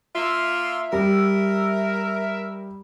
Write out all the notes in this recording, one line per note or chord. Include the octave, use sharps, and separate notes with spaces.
A#3 F4 E5
G3 A#4